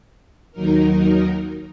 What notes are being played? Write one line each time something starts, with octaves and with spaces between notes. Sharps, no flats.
D#2 F#3 D#4 A#4